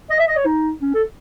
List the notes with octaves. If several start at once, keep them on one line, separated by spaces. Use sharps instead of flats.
D#5
E5
D#5
C#5
D#4
C#4
A4